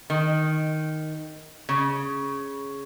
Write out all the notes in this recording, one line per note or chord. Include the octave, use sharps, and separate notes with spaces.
D#3
C#3